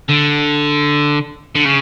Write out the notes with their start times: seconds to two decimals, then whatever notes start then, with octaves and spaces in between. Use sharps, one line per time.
0.09 D3
1.55 D3
1.65 C#3